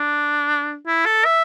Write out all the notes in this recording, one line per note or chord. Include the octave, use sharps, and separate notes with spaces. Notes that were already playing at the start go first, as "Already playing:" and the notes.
Already playing: D4
E4
A4
E5